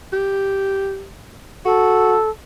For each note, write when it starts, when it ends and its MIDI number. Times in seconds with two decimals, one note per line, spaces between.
0.13 1.06 67
1.65 2.17 66
1.65 2.30 69